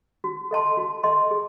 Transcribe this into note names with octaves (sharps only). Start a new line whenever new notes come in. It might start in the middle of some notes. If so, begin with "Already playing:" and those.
F#4
A4 D#5 A5 C6
F#4
A4 D#5 A5 C6
G#4